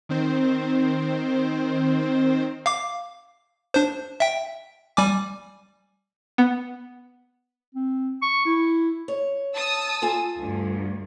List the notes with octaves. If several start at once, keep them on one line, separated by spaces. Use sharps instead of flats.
D#3 C4 C5
F5 D6
D4 C5
E5 G5
G3 G#5 D6
B3
C4
C#6
E4
C#5
A5 D#6 E6
F4 A4 G#5
D2 G2